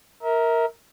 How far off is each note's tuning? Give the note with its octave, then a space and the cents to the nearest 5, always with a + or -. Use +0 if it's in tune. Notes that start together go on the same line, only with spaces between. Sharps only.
A#4 +0 E5 -35